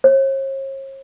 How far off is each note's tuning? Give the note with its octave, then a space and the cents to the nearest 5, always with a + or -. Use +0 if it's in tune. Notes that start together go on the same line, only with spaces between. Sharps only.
C#5 -45